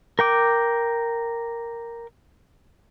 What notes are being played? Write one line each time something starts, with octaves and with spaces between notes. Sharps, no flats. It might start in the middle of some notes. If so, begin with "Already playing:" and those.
A#4 G5 D6